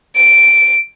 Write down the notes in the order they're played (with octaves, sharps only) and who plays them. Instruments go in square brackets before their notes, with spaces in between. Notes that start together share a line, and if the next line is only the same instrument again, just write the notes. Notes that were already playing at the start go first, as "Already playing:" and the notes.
[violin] D7